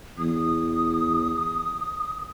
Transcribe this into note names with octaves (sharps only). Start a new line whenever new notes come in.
E2 D#6